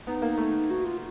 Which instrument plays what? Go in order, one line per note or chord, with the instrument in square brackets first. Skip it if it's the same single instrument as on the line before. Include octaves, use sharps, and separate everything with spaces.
[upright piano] B3 [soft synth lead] D#4
[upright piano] A#3
A3
[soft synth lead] F#4
F4